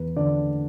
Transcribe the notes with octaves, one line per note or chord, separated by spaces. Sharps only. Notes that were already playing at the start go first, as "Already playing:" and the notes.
Already playing: E2 B4
D3 D5